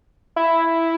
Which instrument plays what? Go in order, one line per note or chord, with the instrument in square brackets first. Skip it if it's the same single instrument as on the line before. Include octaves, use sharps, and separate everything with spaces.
[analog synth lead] E4